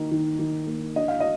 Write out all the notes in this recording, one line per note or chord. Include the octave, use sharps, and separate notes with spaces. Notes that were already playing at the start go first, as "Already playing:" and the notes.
Already playing: D#3 A#3 D#4
D#3
D#3
A#3
D4 D#5
F5
D#5